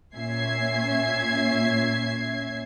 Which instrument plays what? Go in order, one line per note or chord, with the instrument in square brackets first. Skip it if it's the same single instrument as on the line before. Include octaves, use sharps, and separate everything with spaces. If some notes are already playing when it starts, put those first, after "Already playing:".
[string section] A#2 C#4 E5 G#6 C7